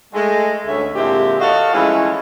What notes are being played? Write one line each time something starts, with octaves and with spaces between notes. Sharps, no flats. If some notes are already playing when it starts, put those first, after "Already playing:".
G#3 A3
D2 C#4 E5
A#2 D3 G#3 C4 E4 G4
F#4 A4 C#5 D#5 F5
E3 F3 G#3 A3 C#4 E4